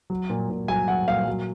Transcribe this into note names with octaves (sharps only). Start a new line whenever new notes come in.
F#3
A#2
A#2
F#3 G#5
F#3 F#5
A#2 F5
F#3